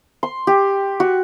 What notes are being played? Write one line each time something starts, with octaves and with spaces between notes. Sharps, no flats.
C6
G4
F#4